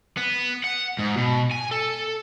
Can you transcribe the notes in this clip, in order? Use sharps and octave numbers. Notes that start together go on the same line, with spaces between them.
B3
F#5
G#2
B2
G#5
A4